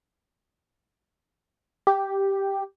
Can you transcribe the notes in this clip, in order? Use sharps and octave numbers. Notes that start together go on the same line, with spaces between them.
G4